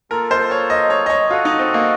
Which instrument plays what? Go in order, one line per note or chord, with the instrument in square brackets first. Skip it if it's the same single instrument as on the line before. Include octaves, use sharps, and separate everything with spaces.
[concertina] A#3 F4 A4 [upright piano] A#4
[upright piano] C5
C#5
D#5
C#5
D#5
C#5
[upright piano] F4 [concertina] F#4 A4 D#5 F#5
[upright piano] D#4
C4
A#3